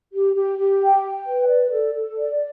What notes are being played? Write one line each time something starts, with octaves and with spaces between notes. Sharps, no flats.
G4
G4
G4
G5
G5
B4
D5
A4
A4
D5